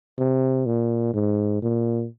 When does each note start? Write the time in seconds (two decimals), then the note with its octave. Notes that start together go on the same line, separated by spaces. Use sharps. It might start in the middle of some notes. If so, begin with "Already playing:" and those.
0.18 C3
0.66 A#2
1.14 G#2
1.62 A#2